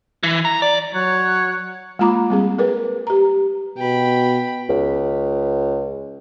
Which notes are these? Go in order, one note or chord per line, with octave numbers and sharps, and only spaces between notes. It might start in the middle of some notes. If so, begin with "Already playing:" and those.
E3
A#5
D5
F#3 C#5 F#6
G#3 A#3 F4 A#5 B5 D6
G3 C4 G#4
G#4 A#4 B4
G4 A#5
B2 G5 B5
C#2